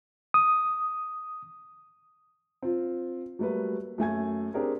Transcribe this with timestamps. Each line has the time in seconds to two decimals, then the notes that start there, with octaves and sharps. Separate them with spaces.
0.34 D#6
2.62 C4 F4
3.39 F#3 G3 A3 A#3 B4
3.98 F#2 A3 G#5 G#6
4.54 C4 D4 G4 G#4 A#4